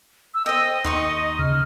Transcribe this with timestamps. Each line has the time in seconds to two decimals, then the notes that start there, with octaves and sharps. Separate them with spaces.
0.34 E6
0.46 C5 D#5 G5
0.84 D#2 D#4 C6 C#6
1.39 C#3 F6